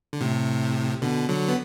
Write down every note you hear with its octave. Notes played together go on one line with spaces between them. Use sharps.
D3
A2 C3
B2 D3
D3 F#3
B3